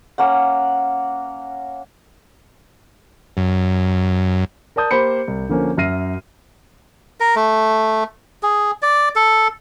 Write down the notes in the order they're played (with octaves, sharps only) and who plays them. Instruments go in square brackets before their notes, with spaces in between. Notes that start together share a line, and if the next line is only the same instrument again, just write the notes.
[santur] A#3 C#4 F#5
[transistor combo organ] F#2
[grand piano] A#4 D5 A5 D#6 G6
A#3 G4 C5 B5 C#7
C2
D3 F3 A#3 C#4
F#2 E5 F6 A#6 C7 D#7
[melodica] A#4
A3
G#4
D5
A4